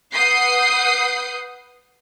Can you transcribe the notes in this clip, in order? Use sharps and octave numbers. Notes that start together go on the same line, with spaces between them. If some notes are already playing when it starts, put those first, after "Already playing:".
B4 F#5 D#6 G6 C7